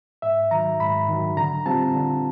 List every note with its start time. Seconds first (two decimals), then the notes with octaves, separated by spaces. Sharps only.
0.22 G#2 E5
0.51 D#3 F#3 A#5
0.80 G#2 B5
1.09 D#3 F#3
1.37 D3 A#5
1.66 G3 C4 F4 A5
1.94 D3